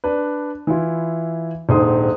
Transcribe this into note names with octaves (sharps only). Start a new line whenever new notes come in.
D4 B4
E3 E4 F4
D#1 A#1 G#2 C5 C6 D#6